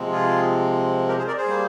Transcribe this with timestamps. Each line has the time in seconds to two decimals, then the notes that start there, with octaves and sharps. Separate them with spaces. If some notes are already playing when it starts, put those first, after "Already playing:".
Already playing: C3 F3 G#3 C4
0.12 F4 G#4
1.08 G4 A#4
1.18 G#4 C5
1.27 A#4 D5
1.38 G#4 C5
1.46 G3 A#3